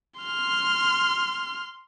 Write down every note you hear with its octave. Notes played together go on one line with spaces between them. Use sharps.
C6 F6